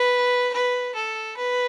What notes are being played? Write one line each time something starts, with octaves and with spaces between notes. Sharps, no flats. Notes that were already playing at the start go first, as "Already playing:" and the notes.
Already playing: B4
B4
A4
B4